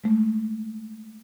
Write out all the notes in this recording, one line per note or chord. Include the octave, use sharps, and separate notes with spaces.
G#3 A3